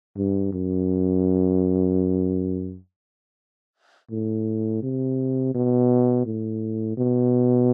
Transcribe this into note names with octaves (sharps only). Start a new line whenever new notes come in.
G2
F#2
A2
C3
B2
A2
B2